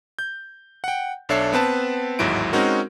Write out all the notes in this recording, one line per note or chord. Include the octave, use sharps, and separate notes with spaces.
G6
F#5 G5
B1 D4 A4 C#5 E5 C7
B3 C4 B4 A5
A1 D#2 G#2 F#3 E4 D7
G#3 C4 C#4 D#4 F#4 A#4